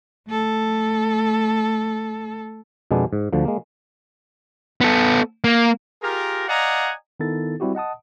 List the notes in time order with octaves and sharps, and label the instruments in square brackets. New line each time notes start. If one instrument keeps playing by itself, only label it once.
[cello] A3 A4
[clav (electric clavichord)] F2 B2 G#3 B3 D4
G#2
D2 D3 F3
G#3 A#3
[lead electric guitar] B3 A4
A#3
[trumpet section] F4 G4 G#4 A#4
D5 D#5 F5 F#5 G#5 A#5
[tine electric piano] D#3 B3 D#4 E4 A4 A6
G3 C4 E4 F#4 G4
D#5 F#5 A5 D#6